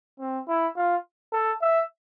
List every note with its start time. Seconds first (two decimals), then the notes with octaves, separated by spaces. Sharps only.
0.20 C4
0.48 E4
0.76 F4
1.32 A4
1.62 E5